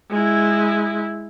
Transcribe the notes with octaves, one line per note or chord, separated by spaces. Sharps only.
G#3 E4